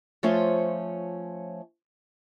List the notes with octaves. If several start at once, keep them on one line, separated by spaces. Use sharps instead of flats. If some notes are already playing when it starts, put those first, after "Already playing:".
F3 A3 C#4 F4 C5 C#5